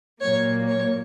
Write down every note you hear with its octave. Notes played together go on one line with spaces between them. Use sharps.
A#2 F#3 A#3 C#5
C#5